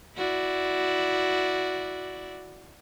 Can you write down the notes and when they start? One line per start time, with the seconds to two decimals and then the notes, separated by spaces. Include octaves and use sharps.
0.16 E4 F#4 D5